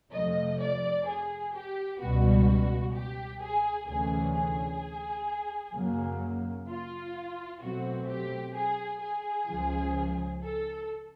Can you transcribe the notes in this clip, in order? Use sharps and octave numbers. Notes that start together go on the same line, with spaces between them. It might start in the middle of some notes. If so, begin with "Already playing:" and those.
F2 C3 F3 A3 D#5
D5
G#4
G4
C#2 B2 G3 B3 F#4
G4
G#4
D2 C3 E3 A3 C#4 G#4
G#4
F#2 C#3 F#3 A#3
F4
B2 F#3 A3 C4 F#4
G4
G#4
G#4
C#2 C#3 F3
A4